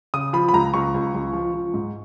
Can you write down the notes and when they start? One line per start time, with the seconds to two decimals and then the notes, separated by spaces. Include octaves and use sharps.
0.14 C#3 D#6
0.33 F3 B5
0.49 B5
0.53 C#2 A#5
0.74 C#2 C#6
0.94 C#2
1.14 C#2
1.33 F3
1.53 F3
1.74 G#2